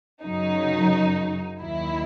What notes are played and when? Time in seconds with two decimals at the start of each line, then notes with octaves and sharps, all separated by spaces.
0.24 F#2 C#3 F#3 D#4
1.60 D#2 D#3 F#3 E4